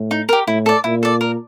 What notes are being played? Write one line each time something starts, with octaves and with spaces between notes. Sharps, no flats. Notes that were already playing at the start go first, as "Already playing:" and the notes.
Already playing: A2
D#4
G4 A#4
A2 E4
A4 D5
A#2 E4
A4 D5
A#4